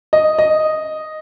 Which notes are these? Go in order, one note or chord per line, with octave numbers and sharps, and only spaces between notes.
D#5
D#5